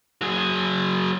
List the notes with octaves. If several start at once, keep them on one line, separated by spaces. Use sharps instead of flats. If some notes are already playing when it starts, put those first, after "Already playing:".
F#3 G#4